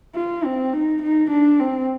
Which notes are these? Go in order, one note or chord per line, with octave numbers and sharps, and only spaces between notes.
F4
C4
D#4
D#4
D4
C4